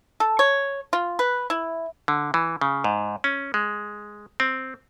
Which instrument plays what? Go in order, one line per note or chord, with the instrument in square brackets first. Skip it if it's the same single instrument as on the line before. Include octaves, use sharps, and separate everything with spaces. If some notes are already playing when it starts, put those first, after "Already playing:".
[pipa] A4
C#5
F4
B4
E4
[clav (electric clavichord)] D3
E3
C#3
G#2
C#4
G#3
C4